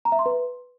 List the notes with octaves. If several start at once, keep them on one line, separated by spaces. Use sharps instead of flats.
A#5
E5
C6
B4